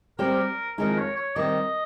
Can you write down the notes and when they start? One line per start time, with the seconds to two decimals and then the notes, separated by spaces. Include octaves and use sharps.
0.19 G3 C4 G4 A#4 C5
0.78 F2 D#3 G#3 D#4 A#4
0.98 C#5
1.16 C#5
1.36 D#3 G3 C4 D#5